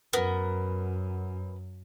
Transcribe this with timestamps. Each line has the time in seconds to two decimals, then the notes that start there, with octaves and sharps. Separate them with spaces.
0.13 F#2 B3 A#4